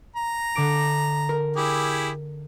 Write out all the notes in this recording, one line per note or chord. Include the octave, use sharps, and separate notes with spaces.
A#5
D3 D6 D7
A#4
E4 G4 G#4